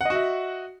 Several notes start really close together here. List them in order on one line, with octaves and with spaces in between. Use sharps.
F#5 D#5 F#4 E5